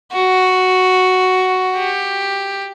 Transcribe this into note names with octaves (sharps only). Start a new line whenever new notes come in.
F#4
G4